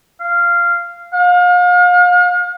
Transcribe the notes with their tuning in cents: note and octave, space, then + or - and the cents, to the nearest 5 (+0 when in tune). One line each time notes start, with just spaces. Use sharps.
F5 -10
F5 +40